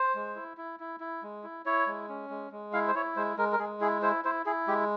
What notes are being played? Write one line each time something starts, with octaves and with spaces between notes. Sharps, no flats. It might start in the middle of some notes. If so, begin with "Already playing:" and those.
Already playing: C5
G#3
E4
E4
E4
E4
G#3
E4
E4 C#5
G#3
C#4
G#3
G#3
E4 F5
C5
E4 C#5
G#3 C5
G#3 A#4
A#4
G#3 G#4
E4 G#4
E4 C5
E4 C5
E4 G#4
G#3 G4